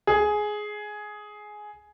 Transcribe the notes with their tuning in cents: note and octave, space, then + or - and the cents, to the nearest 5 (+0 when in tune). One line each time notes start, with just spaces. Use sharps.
G#4 +10